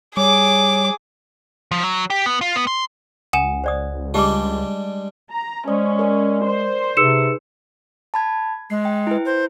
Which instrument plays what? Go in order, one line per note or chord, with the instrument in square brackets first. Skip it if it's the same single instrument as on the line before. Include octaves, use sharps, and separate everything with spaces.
[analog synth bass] G3 [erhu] G#4 [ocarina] C#5 [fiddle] D6
[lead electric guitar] F3
F#3
G4
B3
F4
B3
C6
[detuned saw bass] C#2 [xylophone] F#5 G#5 E7 [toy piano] D#6
[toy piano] C5 D5 D#6
[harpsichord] G3 G#3 D4 [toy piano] G4 D6
[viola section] A#5
[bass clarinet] G#3 [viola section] C#4 [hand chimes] C5 D5 D#6
[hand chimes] A#4 D5
[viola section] C5
[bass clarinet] C3 [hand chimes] D#4 G#4 B4 [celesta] E6 C#7 E7
[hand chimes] A5 B5 G#6
[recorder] G#3 [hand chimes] C7
[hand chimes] G5
E4 B4
[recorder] C5